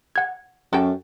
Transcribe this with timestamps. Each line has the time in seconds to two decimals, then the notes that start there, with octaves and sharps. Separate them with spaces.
0.16 F#5 G#6
0.73 F#2 F#4 A4 G5